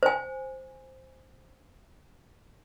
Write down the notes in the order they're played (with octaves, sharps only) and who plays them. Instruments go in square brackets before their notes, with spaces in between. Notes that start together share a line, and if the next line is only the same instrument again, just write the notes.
[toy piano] C5 G#5